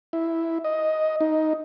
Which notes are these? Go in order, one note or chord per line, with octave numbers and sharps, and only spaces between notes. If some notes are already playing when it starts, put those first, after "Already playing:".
E4
D#5
D#4